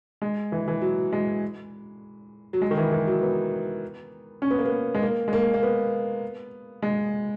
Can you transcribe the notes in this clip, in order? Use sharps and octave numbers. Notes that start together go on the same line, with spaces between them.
G#3
E3
E3
F#3
G#3
F#3
G#3
D#3
E3
E3
F#3
B3
C#4
B3
A#3
B3
G#3
A#3
G#3
A#3
A#3
B3
G#3